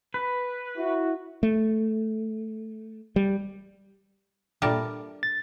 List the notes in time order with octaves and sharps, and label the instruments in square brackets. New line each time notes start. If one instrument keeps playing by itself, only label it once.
[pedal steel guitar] B4
[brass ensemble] E4 F#4
[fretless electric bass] A3
G3
[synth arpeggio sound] A#2 D5 [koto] G3 A#4 A5 [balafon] D4 A4 E5
[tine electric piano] A6